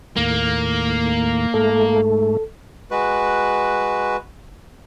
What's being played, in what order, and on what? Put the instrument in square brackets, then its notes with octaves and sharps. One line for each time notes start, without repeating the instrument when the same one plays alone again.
[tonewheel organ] D#2 A2 [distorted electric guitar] A#3
[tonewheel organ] G#2 A3 [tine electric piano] A4
[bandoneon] G#3 F#4 B4